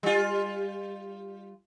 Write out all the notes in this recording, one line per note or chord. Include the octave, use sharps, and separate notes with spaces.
G3 F4